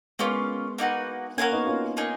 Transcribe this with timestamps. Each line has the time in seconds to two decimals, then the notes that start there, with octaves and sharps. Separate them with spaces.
0.19 G#3 A#3 B3 C#4 F4
0.78 A#3 D#4 F#4 B4
1.37 A#3 C#4 F#4 A#4 F5 G#5
1.52 B3 D#4
1.67 C#4 F4
1.97 A#3 D#4 G#4